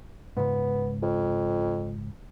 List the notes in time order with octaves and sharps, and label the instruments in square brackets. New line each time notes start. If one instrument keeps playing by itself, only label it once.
[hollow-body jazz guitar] C#2 G#2 [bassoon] B3
[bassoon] F2